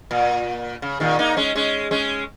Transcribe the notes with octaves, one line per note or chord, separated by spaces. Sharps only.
A#2
C#3
A#2 D#3
A#3 D#4
G#3 C#4
G#3 C#4
G#3 C#4